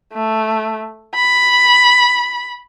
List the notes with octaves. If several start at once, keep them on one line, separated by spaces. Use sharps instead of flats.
A3
B5